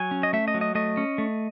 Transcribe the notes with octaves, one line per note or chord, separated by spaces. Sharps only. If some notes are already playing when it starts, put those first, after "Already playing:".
Already playing: F#3 G#5
C#4
D#5
A3 E5
D#5
F#3
D#5
A3 D#5
C#4
A3